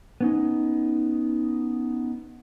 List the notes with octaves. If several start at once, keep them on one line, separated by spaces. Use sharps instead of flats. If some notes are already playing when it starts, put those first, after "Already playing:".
B3 C#4 D#4